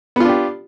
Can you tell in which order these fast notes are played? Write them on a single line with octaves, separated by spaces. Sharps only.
B3 F4 D4 G4